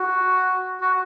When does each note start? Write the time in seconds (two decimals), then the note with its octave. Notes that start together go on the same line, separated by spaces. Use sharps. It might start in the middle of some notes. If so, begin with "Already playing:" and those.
Already playing: F#4
0.81 F#4